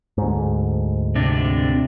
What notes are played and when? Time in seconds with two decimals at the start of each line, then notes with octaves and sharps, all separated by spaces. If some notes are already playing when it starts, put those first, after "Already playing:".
0.18 D2 G#2
1.15 C3 D4